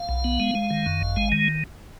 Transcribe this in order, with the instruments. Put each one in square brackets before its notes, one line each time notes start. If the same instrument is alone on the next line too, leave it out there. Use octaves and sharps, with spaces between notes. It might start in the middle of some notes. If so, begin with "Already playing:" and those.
Already playing: [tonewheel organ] F5
B1
B3
G#3
G#3
D#3
F#2
G#1
G#3
D#3